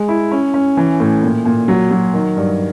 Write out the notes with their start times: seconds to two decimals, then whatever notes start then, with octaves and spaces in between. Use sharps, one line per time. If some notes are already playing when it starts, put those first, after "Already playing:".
Already playing: G#3
0.09 E4
0.32 C#4
0.54 C#4
0.77 E3
1.00 A2
1.23 A#2
1.45 A#2
1.68 F#3
1.91 F#3
2.13 D#3
2.37 G2